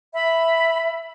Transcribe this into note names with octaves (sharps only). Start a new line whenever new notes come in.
E5 B5